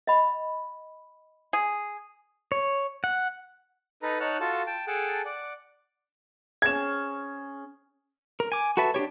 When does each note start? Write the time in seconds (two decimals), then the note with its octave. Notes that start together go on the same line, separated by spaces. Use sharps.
0.07 D#5 F#5 B5
1.53 G#4
2.52 C#5
3.04 F#5
4.03 D#4 A4 B4 A#5
4.20 D#4 C#5 F#5 A5 F6 F#6
4.40 F4 F#4 A4 A5
4.67 G5 A5
4.87 G#4 A4 F#5 G5 A5
5.25 D5 F#5
6.62 C#4 G#4 G#6 E7
8.40 A#4
8.52 G#5 D6
8.77 F#4 A4 B4 E5 A5
8.94 D4 E4 G4 C#5